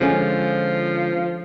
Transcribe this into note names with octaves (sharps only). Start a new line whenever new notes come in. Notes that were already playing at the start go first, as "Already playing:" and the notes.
D3 F3 G#3 C#4